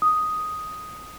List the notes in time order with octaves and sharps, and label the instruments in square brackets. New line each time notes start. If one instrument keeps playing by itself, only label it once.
[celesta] D#6